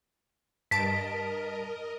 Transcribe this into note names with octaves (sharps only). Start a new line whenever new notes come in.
G2 A#4 D#5 A5 B6 D7